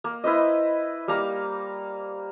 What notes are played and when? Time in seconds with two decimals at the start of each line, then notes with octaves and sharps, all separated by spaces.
0.04 A#3
0.24 E4 B4 C5 D#5
1.08 G3 A#3 F5 A#5